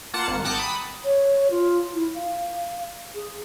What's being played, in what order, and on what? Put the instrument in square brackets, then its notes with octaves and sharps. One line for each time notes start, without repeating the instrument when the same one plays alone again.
[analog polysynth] A#3 F4 F#5 A5 C#7 E7
G#1
F#5 G5 A5 A#5 D6 D#6
B5 D#6
[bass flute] C#5
F4
E4
F5
G#4